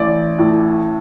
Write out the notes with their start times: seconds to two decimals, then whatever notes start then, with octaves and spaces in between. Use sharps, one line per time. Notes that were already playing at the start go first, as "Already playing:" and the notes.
Already playing: A1 D5
0.38 A2